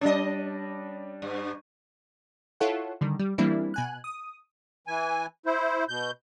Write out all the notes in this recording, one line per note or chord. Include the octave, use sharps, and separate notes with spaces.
G3 C#4 D4 D5 D#5
G2
E4 F4 A4 C#5 F#5
D3 D#3 G3
G3
E3 G3 A#3 C4 D4 E4
B2 G#5 F#6
D#6
E3 G#5
E4 C5
B2 G6